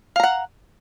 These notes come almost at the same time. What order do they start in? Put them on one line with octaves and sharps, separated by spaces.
F5 A#5 F#5